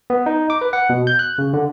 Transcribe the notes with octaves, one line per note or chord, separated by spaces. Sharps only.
B3
D#4
D6
B4
F#5
B2
G6
F#6
C#3
D3